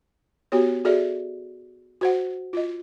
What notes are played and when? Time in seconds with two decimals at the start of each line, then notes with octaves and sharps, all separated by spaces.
0.52 B3 F#4 G4 C#5
0.85 F#4 G#4 A4 D5 E5
2.01 F#4 C5 F#5
2.53 F4 D#5